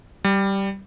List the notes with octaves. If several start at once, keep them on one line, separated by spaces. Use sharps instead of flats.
G3